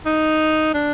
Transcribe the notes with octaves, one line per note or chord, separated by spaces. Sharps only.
D#4
D4